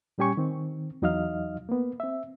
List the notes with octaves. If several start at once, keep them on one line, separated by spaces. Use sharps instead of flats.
A#2 G3 C#4 G4 G#5 C#6
D#3 C4
E2 F#3 D#4 D#5 F5 F6
A#3 B3
C4 E5